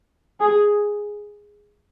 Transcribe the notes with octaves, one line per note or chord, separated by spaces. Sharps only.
G#4